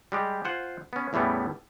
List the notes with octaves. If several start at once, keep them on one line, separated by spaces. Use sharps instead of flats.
G3 G#3 G4
F4 C5 F#5 G#5
B3 C#4
E2 A2 E3 G3 B3 C#4